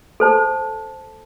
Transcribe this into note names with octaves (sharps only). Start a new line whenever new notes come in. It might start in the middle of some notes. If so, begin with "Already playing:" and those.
A4 C5 A5